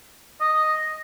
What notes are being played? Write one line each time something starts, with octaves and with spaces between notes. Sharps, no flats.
D#5